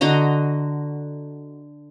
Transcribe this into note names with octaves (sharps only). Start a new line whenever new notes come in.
D3 F#4 D#5 A#5